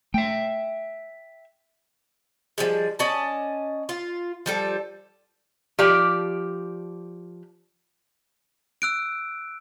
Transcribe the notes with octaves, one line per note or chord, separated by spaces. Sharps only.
A3 E5 G5
F3 G3 G#3
C#4 D5 D#5 A5
F4
F3 G3 A4
F3 G4 D5
E6 F#6 D7